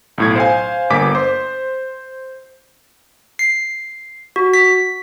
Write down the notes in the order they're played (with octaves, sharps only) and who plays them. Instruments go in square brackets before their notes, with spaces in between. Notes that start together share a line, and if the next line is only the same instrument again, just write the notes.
[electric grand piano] B1 A2 G#6
C5 F5 G#5
G1 A#3 G#5 D6 B6
C5
[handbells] C7
F#4
B6